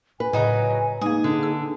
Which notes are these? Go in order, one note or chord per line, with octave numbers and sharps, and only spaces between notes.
B4 G#5
A2 C#3 F#3 D#4
D#5
G#3 A#3 D#4 G#4
D3
E6